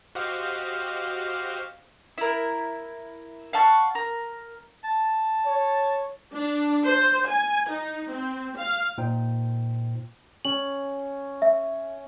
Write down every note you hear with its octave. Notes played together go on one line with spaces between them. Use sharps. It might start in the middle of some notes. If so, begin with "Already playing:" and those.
F#4 G4 C5 D#5 F5
E4 A#4
F5 F#5 A5 C#6
A#4
A5
C#5
D4
C5
G#5
D#4
C4
F5
A#2 D#4 C5 G5
C#4 F#7
E5